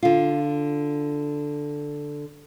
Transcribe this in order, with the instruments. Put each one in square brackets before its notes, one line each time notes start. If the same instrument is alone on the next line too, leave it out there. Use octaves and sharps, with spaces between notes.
[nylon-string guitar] D3 F4